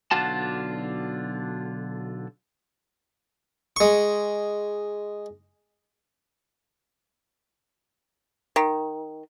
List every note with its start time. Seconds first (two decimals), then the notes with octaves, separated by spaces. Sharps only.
0.11 B1 D3 D4 F4 F#4 A5
3.76 G#3 C#6
8.56 D#3